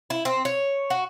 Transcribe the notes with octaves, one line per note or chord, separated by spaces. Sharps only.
E4
C4
C#5
F#4